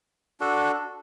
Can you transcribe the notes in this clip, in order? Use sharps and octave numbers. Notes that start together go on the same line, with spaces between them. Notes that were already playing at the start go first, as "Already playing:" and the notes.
D4 F#4 A4